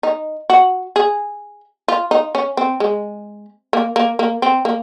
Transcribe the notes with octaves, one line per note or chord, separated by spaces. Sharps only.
D#4
F#4
G#4
F4
D#4
C#4
C4
G#3
A#3
A#3
A#3
C4
A#3